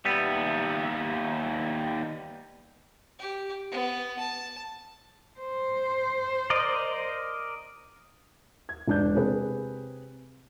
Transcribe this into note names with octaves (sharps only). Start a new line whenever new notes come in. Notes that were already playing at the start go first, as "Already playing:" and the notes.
D#2 G3 B3 E5
G4
B3
A5
C5
A#4 D5 D#5
G#6
E1 D4 G6
C3 G#4 B4